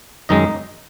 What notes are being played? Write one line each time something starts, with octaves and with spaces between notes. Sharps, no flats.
F#2 D#3 G#3 D#4 D#5